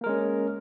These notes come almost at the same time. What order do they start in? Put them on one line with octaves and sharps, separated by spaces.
A#3 A#4 G#3 C#4